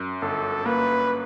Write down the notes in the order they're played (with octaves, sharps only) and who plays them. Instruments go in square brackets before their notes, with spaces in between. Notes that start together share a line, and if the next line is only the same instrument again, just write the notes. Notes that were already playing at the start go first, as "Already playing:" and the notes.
Already playing: [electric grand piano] F#2
[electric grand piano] G1 [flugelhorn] A4
[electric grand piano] A#3 [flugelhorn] B4